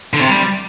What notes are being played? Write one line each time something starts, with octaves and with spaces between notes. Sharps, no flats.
D3
C3
G3